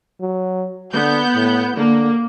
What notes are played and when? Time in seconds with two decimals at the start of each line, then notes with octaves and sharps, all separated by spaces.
0.21 F#3
0.93 D3 B3 G6
1.36 A2
1.77 D3 A#3